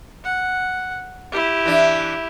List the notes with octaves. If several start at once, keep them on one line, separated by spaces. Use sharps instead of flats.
F#5
E4 G4
E3 D4